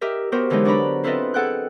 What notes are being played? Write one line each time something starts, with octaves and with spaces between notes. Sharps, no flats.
G4 A#4 D#5 E5
B3 F#4 G4 A#4 C5
D3 E3 F#3 G#3 D#4
D4 F#4 D5 A#5 B5
C4 E4 F4 A4 B4 D#5
G#4 A4 F#5 G5 F#6